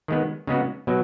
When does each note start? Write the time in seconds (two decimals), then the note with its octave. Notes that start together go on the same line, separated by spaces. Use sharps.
0.08 D#3 G#3 B3
0.47 C#3 G#3 B3 F#4
0.87 B2 F#3